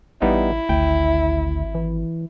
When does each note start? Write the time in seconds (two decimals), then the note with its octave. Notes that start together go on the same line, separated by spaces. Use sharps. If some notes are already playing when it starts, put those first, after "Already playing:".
0.22 A1 G3 B3 D#4 E4
0.69 G#1 D2 G5
1.75 E3